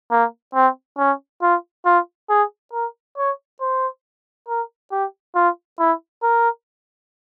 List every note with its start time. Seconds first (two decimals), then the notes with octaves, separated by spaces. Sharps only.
0.11 A#3
0.55 C4
0.98 C#4
1.42 F4
1.86 F4
2.30 G#4
2.73 A#4
3.18 C#5
3.61 C5
4.48 A#4
4.92 G4
5.36 F4
5.79 E4
6.23 A#4